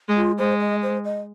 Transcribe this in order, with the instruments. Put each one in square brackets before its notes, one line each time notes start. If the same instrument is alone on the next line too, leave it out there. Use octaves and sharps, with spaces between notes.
[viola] G#3
[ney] F4
[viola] G#3 [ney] C5
[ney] D#5
C5
D#5